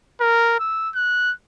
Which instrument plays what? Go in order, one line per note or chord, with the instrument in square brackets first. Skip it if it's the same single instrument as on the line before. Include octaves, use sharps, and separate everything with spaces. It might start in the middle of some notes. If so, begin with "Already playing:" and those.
[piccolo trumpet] A#4
E6
F#6